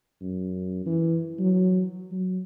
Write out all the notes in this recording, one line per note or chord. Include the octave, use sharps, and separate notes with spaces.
F#2
E3
F#3
F#3